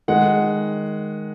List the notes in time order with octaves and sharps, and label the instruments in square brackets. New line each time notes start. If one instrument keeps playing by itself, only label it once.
[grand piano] D#3 G#3 F#5